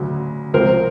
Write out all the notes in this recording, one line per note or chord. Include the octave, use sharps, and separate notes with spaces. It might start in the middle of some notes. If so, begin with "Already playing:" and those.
Already playing: D2 C#3 F#3
C#2 C3 F3 A#4 C5